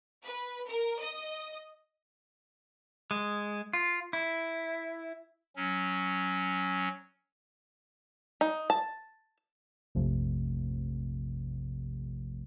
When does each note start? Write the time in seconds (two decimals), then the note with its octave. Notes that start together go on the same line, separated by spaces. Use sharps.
0.23 B4
0.68 A#4
1.00 D#5
3.11 G#3
3.73 F4
4.13 E4
5.56 F#3 C#4
8.41 D#4
8.70 A5
9.95 A#1 F2 C3 F3 A3